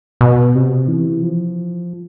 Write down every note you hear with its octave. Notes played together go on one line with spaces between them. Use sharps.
B2
C3
E3
F3